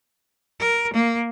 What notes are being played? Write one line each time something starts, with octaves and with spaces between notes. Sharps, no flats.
A#4
A#3